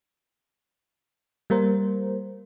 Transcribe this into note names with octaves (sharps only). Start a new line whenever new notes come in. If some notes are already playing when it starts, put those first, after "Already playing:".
G3 A#3 A#4 C5